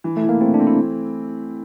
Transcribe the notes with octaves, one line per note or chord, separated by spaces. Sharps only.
E3
A3
E4
A#3
A3 C4
D4
C4
E4